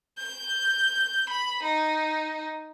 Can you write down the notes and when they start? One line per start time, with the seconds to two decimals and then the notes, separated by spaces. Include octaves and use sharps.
0.18 G6
1.30 B5
1.63 D#4